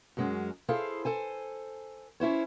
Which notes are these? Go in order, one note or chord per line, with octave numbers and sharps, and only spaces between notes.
F#2 F#3 G#3 C4 C#4
E4 G#4 A4 C5 F5
A4 C5 G#5
C#4 E4 C5 C#5